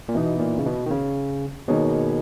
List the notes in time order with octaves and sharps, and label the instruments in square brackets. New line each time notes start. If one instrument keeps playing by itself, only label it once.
[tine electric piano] A#2
[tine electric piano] B2 [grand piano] E3 B3 D#4
[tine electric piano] A#2
C#3
B2
D#3
C#3
[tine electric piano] B2 [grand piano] D#3 A#3 D#4 G#4 C#5